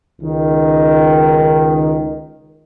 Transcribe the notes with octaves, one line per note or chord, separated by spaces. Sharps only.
C#2 D#3